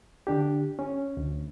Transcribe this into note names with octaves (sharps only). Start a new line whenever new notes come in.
D3 D4 G4
C#4
D2